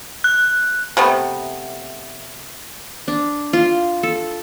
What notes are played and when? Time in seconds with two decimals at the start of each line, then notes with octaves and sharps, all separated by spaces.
0.24 F#6
0.97 C3 A3 B3
3.08 D4
3.53 F4
4.03 A4